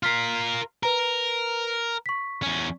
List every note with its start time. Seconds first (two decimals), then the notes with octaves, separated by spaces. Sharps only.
0.03 F4 A#4 F6 B6 C7
0.83 A#4 B4 A#5
2.06 C#6 B6
2.43 E2 C#4